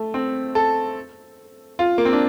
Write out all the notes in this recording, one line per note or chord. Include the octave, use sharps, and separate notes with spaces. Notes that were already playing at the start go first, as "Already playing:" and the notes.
Already playing: A3
C4
A4
F4
A#3
C4
D4